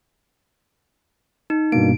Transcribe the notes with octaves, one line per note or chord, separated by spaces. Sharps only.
D#4
G2 B2 A#3 D7